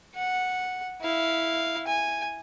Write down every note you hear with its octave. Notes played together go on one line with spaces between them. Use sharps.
F#5
E4 F5
G#5